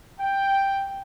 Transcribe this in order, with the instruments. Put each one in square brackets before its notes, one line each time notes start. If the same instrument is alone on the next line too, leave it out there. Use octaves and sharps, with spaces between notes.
[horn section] G5